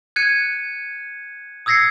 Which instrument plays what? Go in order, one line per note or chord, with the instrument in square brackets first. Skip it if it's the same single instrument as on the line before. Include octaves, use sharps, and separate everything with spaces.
[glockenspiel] F#6 G#6 C#7 D#7
D#6 E6 G#6 A#6 C7 C#7